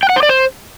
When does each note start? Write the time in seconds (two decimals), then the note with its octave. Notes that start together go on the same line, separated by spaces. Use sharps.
0.03 G5
0.09 F#5
0.16 C5
0.23 D5
0.29 C5